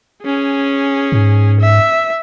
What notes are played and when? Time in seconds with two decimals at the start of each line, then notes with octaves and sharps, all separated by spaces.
0.24 C#4 G#4
1.12 G#2
1.60 E5